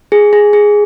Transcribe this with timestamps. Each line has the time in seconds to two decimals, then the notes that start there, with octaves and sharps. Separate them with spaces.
0.12 G#4
0.33 G#4
0.53 G#4